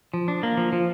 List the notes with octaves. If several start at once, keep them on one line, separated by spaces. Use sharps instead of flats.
F3
D4
A#3
F3
F3